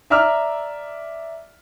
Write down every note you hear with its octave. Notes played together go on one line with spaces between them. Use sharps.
D5 E5 A#5 D6 E6 F6